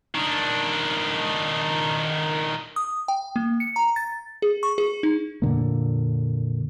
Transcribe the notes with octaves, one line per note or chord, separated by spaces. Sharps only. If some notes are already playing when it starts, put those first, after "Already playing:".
D#3 D4
D#6
G5
A#3
C#7
A#5
A6
G#4
C#6
G#4
D#4
F2 A#2 D3 A#3